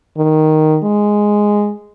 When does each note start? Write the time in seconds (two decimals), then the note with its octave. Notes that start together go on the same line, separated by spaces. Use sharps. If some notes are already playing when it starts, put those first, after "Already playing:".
0.17 D#3
0.83 G#3